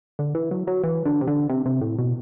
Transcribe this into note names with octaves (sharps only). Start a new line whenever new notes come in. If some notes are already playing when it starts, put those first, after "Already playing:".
D3
E3
F#3
F#3
E3
D3
C3
D3
C3
C3
A2
B2